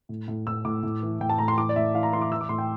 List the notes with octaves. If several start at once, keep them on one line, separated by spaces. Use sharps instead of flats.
A2
A2
A2 E6
A2 D6
A2
E3
A2 G5
A5
A2 A#5
C6
E3 D6
D5
A2 E5
E3 F5
A#5
E3 C6
D6
E3 E6
D6
A2 C6
G5